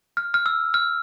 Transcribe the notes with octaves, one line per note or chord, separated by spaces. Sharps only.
F6
F6
E6
F6